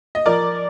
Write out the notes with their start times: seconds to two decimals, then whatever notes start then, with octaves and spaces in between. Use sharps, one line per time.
0.15 D#5
0.26 F3 A#4 D5